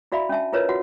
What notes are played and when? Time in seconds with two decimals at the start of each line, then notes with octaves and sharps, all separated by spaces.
0.12 E4 F#4 D5 E5 F5 B5
0.29 C#4 D4 E5 A5
0.53 E4 F4 A#4 B4 C#5 D#5
0.69 F4 F#4 F#5